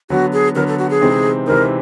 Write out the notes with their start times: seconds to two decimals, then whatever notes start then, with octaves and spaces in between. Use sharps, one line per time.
0.10 D3 F#3 B3 F#4
0.33 G#4
0.55 D3 F#3 B3 A#4
0.67 A4
0.79 F#4
0.90 G#4
1.01 C3 E3 G#3 C4 D#4
1.47 C3 E3 G#3 C4 D#4 A#4